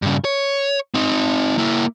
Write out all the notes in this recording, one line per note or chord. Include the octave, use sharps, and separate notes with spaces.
G2 C#3
C#5
C4 D#4
A#3 E4